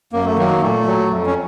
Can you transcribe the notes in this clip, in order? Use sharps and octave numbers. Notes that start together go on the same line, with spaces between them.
F#2 A#3
A3
D#3 F#3 A#3
A#2 A3
F#3
F2
C#4